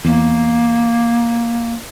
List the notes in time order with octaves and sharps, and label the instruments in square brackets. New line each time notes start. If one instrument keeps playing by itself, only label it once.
[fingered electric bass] E2 [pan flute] A#3